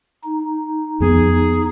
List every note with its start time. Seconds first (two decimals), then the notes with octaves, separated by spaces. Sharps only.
0.24 D#4
1.00 F2 F3 B3 G#4